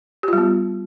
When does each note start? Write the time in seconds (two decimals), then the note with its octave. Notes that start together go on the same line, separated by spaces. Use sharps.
0.23 G4
0.28 F4
0.33 G3
0.38 B3